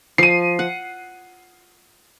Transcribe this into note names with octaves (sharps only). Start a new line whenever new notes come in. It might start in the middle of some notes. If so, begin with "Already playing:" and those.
F3 C7 D#7
F#5